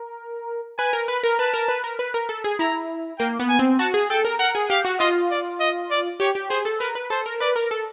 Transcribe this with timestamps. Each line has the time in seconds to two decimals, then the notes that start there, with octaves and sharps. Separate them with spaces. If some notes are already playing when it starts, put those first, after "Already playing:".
Already playing: A#4
0.78 B4 G#5
0.93 A#4
1.08 B4
1.23 A#4
1.39 B4 A5
1.54 A#4
1.68 B4
1.84 A#4
1.99 B4
2.14 A#4
2.29 A4
2.44 G#4
2.59 E4 A#5
3.19 A#3 G5
3.39 B3
3.49 G#5
3.59 C4
3.79 F#4 A5
3.94 G#4
4.10 A4 G5
4.25 A#4
4.39 A#4 F#5
4.55 G#4
4.70 G4 F5
4.85 F#4
4.99 F4 D#5
5.30 D5
5.60 D#5
5.91 D5
6.20 G4 C#5
6.35 G4
6.50 G#4 C5
6.65 A4
6.80 A#4 B4
6.95 B4
7.10 A4 C5
7.26 A#4
7.40 B4 D5
7.56 A#4
7.71 A4